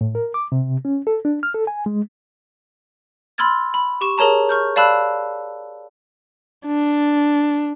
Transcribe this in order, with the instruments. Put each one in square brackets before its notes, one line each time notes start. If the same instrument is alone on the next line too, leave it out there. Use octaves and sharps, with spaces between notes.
[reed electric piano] A2
A#4
D6
C3
C#4
A4
D4
F6
A4
G#5
G#3
[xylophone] B5 C6 E6 F6 G#6 A6
B5
G4 C#6 E7
G#4 A#4 C#5 A5 A#5
C#6 F6 G6
D5 F5 A5 B5 E6 F#6
[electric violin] D4